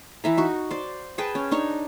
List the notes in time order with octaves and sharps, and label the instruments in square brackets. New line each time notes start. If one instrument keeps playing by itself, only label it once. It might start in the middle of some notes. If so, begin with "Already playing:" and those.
[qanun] E3 E5 A#5
D#4 F#4
C5 D5
G#4 B4 G5 A5
C#4
D4 D#4 C#5